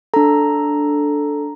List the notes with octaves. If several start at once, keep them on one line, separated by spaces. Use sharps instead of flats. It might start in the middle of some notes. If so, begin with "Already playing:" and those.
D4 A4 A#5